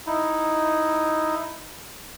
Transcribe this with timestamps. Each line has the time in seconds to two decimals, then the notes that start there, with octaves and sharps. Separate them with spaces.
0.07 D#4 E4